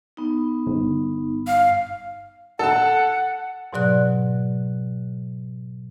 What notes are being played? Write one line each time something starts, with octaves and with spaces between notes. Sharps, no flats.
B3 D#4
G1
F5
A4 F#5 A5
G#2 B2 F#3 D5 F#6